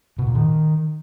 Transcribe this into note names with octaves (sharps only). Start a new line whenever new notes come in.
B2
A#2
D#3